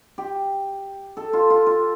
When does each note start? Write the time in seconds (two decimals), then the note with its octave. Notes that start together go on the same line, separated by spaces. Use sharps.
0.18 G4
1.17 A4
1.33 F4
1.50 F4
1.67 F4